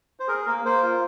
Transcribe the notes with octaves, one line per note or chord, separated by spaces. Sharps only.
C5
G#4 A#4
A#3 A#4
A#3 C5
F4